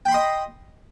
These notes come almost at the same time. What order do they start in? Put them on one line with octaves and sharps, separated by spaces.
G5 B5 C6 D#5